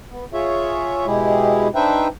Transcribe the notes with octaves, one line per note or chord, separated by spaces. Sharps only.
B3
F4 G#4 C#5 E5
B2 G#3 E4 G4 G#4
D4 D#4 B4 C5 E5 G5